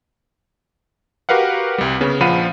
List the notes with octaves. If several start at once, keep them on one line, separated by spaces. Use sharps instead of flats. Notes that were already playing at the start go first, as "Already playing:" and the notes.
F#4 G4 A#4 B4 F5 F#5
C2 G3
C#3 B3 C#4
A#1 F3 F5 F#5 B5 D#7